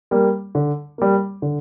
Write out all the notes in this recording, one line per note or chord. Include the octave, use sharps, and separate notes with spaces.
G3 A#3
D3
G3 A#3
D3